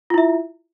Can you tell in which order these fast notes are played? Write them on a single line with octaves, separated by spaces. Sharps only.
F4 E4 E5